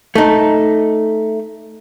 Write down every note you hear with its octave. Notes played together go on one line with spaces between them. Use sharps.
A3 D#4